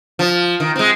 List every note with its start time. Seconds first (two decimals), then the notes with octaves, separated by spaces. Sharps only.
0.19 F3
0.60 D#3
0.76 G#3 C4